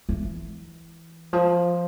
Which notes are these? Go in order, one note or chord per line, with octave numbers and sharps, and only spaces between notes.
E3
F3